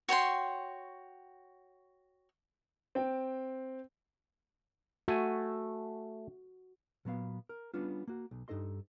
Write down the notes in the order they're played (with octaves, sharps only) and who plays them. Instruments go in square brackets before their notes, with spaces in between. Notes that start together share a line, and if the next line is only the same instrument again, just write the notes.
[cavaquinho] F#4 C#5 G5 C6
[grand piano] C4 G5
[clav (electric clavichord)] A3 G#5 [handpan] F#4
[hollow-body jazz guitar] A#2 F#3 B3 F5
A#4
G3 B3 C#4 D4 F4
A#3 F#4
B1
G2 D#4 A4 D#5 C6